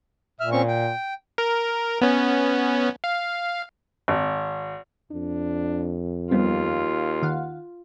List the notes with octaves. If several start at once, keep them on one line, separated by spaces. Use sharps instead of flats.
A#2 E5 F6
C4 C#4 C#6
G5
A#4
B3 C#4
F5
G#1
F2 D4
D#2 G3 B3 C4 F4
D#3 F5 F#5